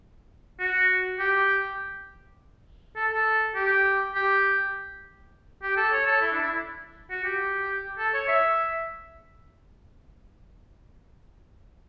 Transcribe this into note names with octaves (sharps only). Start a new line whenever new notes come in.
F#4
G4
A4
A4
G4
G4
G4
A4
C#5
A4
E4
D4
E4
F#4
G4
A4
C#5
E5